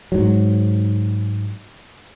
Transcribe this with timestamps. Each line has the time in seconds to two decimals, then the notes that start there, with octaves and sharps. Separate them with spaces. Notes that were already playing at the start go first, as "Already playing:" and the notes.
0.12 G#2 F#3